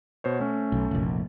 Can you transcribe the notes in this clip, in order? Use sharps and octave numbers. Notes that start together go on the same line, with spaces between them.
B2 C5 C#5
A3 C#4
B1
F1 A#1